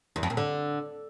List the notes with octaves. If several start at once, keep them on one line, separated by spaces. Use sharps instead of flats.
E2
F2
A#2
D3